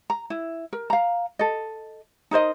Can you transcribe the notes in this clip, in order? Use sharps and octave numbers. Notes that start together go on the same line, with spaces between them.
A#5
E4
A#4
F5 A#5
A4 D#5
D#4 A#4 C5 D#5